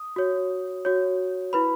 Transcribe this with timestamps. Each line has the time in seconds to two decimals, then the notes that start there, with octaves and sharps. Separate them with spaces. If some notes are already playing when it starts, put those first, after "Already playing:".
Already playing: D#6
0.16 F#4 C#5
0.85 F#4 C#5
1.53 E4 B4 B5